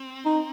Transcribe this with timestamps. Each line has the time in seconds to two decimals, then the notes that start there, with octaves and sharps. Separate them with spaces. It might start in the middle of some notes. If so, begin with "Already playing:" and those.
Already playing: C4
0.26 D#4